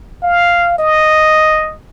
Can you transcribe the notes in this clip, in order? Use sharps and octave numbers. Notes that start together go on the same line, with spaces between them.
F5
D#5